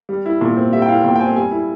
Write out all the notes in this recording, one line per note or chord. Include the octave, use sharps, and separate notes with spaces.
G3
E4
A#2
C4
G3 E5
G5
E4 F5
A#2 G5
G5
C4 G#5
G3 G#5
E4